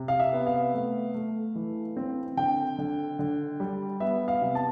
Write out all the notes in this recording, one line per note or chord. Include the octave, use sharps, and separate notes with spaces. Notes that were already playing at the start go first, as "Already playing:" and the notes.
Already playing: C3
F5
E5
B3
F5
A3
A3
E3
C4
D3 G5
D3
D3
G3
B3 E5
F5
C3
A5